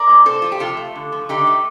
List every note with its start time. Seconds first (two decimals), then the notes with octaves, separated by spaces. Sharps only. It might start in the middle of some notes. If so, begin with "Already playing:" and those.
Already playing: A#4 D5
0.09 A#2
0.26 C3 A4 C5
0.42 F3 F4
0.52 G4
0.60 C3 F4 A4
0.77 A3
0.95 D3
1.12 F3
1.29 D3 D#4 G4
1.47 A3